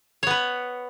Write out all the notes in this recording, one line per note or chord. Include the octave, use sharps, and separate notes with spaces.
B3 B4 C#5